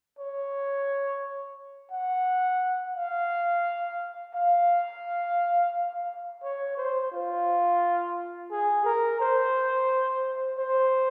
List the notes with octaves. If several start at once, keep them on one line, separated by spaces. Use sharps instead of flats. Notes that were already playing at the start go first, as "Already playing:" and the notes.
C#5
F#5
F5
F5
C#5
C5
F4
G#4
A#4
C5
C5